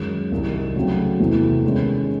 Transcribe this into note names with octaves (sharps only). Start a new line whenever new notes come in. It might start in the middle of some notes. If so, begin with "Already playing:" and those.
Already playing: F#2 D#3 G#3
C2 C3 D#3
C#3 F#3 A3 C4
E2 C3 E3 A3
D#3 G#3 C#4